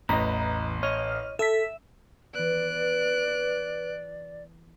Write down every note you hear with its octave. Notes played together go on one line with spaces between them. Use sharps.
A1 E2 B3 D#5 A#5 B5
C#5 D#5 F6
A4 E5 E6 B6
E3 B3 B4 D5 F#6 D7